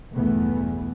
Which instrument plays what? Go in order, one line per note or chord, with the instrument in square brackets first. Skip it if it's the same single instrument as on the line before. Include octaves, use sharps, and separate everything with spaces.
[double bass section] B1 E2 G2 E3 A3 B3